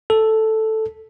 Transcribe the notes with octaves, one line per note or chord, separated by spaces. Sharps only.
A4